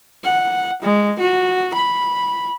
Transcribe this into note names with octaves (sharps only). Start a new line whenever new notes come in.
F#5
G#3
F#4
B5